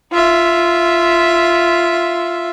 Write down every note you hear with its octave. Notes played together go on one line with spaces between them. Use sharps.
F4 E5